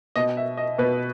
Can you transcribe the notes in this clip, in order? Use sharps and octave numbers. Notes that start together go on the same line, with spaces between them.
B2 D#5
E5
D#5
B2 B4